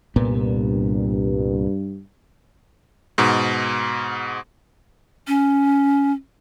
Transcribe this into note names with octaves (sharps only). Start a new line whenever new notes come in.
C2 G2 A#2 B3
G#2 B2
C#4